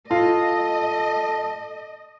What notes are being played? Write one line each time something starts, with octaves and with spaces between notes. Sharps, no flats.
F4 A4 D#5